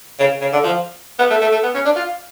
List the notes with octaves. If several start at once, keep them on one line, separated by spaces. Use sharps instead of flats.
C#3
C#3
D3
F3
B3
A3
A3
A3
B3
C#4
D4
F4